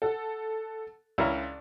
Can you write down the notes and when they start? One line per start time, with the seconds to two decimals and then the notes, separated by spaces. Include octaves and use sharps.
0.02 A4 F#5
1.18 C#2 D4 E4 A#4